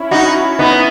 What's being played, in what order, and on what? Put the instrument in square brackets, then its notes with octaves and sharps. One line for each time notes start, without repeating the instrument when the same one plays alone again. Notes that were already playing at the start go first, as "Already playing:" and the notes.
Already playing: [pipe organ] C#4 E4
[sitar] D#4 F#4
B3 D#4